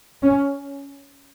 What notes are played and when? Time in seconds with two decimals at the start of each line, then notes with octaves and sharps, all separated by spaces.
0.23 C#4